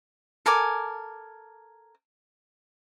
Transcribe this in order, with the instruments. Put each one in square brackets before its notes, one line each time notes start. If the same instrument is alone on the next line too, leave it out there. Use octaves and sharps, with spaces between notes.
[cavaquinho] A4 A#4 G#5 D6